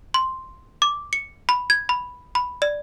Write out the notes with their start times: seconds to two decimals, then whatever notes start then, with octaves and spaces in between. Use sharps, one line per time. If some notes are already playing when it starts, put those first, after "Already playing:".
0.14 C6
0.82 D6
1.13 C#7
1.49 B5
1.70 G#6
1.89 B5
2.35 B5
2.62 D5